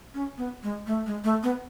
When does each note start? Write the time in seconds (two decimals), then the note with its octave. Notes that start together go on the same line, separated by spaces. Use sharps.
0.14 C#4
0.38 B3
0.63 G#3
0.87 A3
1.06 G#3
1.24 A3
1.43 B3